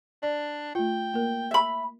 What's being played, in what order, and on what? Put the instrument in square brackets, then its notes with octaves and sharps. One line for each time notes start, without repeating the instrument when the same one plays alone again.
[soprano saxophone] D4 [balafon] D5
[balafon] A3 F4 [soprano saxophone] G5
[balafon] A#3 A#4
[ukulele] E5 B5